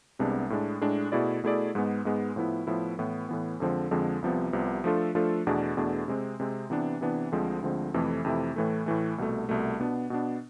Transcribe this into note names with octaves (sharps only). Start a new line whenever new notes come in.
C2 C3 G#3 B3 D4
A2 G#3 D4
A2 G#3 D4
B2 A3 E4 G#4 D5
B2 A3 E4 G#4 D5
G#2 G#3 B3
G#2 G#3 B3
A2 F3 B3 E4
A2 F3 B3 E4
A2 E3 B3
A2 E3 B3
F2 D3 F3 G#3 C4
F2 D3 F3 G#3 C4
C2 C3 F3 B3
C2 C3 F3 B3
F3 A3 D4 F4 A4
F3 A3 D4 F4 A4
E2 B2 A3 D4 G#4
E2 B2 A3 D4 G#4
C3 G#3 C4
C3 G#3 C4
C3 E3 B3 D4
C3 E3 B3 D4
D2 D3 F3 G#3 C4
D2 D3 F3 G#3 C4
F2 C3 E3 A3 E4
F2 C3 E3 A3 E4
A2 E3 A3
A2 E3 A3
C2 B2 A3
C2 B2 A3
B2 B3 D4
B2 B3 D4